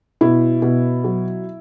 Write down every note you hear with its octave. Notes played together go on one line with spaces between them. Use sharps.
B2 E4
B2
F#3